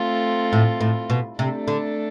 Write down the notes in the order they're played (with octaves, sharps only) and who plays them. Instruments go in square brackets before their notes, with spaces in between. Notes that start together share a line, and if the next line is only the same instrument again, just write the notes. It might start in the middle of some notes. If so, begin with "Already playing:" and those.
Already playing: [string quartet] A3 C4 F4 A4
[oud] A2
A2
B2
[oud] C3 [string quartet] A3 D4 A4
[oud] D3